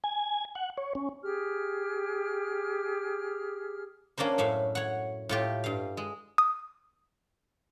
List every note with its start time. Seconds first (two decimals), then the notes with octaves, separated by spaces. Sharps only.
0.04 G#5
0.55 F#5
0.78 C#5
0.95 C#4
1.23 G4 G#4 F6
4.18 A#3 C#4 D4 A#4 C5
4.38 F#2 A2 E5 F5
4.75 C#5 F#5
5.29 A2 F4 G4
5.64 G2 F5
5.97 G#3
6.38 D#6